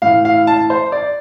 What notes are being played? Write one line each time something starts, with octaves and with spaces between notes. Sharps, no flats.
A2 E3 F5
F5
A5
C5
D5